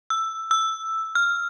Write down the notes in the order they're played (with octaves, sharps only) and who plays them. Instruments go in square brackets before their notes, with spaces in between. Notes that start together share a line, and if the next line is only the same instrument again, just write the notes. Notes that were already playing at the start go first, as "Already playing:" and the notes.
[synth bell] E6
E6
F6